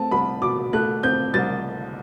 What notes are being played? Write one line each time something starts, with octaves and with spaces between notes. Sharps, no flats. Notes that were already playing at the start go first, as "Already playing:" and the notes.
Already playing: A3 C4 A5
C2 B5
B2 D6
A3 F#6
C4 G6
C2 A6